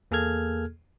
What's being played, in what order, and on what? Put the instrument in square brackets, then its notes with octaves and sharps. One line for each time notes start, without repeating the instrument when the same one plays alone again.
[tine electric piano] E2 A#3 G#4 A4 F6 G#6